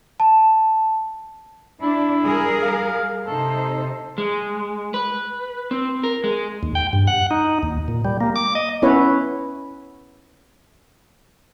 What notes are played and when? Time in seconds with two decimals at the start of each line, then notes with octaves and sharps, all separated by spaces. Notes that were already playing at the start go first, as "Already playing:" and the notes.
0.20 A5
1.82 D4 E4
2.22 G3 G#4 A#4
2.62 F5
3.27 C3 D#4 A4 C5
4.18 G#3
4.94 B4
5.71 C4
6.04 A#4
6.24 G#3
6.63 D#2
6.75 G5
6.93 G2
7.07 F#5
7.31 D#4
7.63 D#2
7.88 A#2
8.05 G3
8.21 A#3
8.36 D6
8.55 D#5
8.82 B3 C#4 E4 B4 C#5